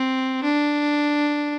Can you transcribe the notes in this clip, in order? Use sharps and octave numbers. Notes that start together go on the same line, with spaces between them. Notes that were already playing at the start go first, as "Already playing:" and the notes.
Already playing: C4
D4